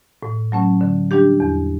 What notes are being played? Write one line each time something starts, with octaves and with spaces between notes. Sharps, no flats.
A2
F#3 A3 C#4
D3
G3 D4 G4
E2